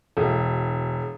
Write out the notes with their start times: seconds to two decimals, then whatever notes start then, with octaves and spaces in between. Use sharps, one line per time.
0.17 E1